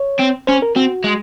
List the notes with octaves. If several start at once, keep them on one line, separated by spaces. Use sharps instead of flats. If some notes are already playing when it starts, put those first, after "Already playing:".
Already playing: C#5
C4
C#4 C5
A#4
C4 F#4
G#3